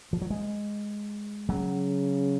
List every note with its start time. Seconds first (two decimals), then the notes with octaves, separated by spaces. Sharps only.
0.13 F3
0.22 F#3
0.30 G#3
1.49 C#3 F#3